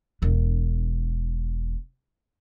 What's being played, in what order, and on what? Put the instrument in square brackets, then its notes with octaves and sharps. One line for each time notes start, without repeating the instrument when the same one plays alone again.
[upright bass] E1 D4